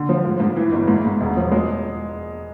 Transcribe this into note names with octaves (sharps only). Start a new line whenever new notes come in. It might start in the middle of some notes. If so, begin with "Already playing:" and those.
Already playing: D3
F3
G#2
G#2
E3
G1
G#2
G#2
E1
F3
G#3